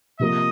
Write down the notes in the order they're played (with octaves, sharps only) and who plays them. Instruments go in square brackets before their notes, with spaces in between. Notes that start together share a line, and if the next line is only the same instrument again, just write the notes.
[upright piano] C3 F3 A#3 [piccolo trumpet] D#5